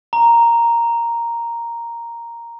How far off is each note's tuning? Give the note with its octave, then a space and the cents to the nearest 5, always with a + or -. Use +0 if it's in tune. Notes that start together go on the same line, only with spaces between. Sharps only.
A#5 +0